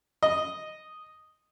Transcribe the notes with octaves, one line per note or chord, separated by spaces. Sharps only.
D#5